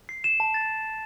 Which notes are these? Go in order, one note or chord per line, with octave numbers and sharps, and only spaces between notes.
C7
E7
A5
A6